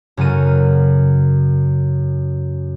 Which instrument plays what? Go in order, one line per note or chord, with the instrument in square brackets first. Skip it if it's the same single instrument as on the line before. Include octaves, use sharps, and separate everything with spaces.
[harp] F#2 C#3 A4 A#4 D#7